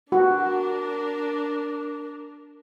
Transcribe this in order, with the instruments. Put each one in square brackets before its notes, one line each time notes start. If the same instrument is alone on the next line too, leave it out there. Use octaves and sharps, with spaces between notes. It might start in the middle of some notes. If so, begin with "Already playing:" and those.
[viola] D4 A#4 [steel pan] F#4